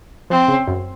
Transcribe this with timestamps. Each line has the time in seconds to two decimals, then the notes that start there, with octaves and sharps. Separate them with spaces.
0.30 F3 C4
0.48 C#3
0.68 F#2